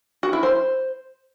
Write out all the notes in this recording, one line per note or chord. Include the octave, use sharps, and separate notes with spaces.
F#4
E4
C5